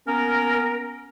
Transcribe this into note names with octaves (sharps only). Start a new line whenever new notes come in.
A#3 B3 C#4 A#4